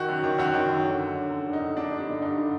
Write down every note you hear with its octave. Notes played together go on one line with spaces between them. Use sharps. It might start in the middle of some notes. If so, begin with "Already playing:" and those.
Already playing: D#3 F#4
F#2
D#3
F#2 F#4
D#3
F#2
D3
F#2
D3
F#2
D3
D#4
F#2
D3 D4
G2 D#4
D4
D3
G2 D#4
D3